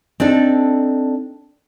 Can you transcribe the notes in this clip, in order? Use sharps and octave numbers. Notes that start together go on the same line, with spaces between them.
C4 D4 D#4 A4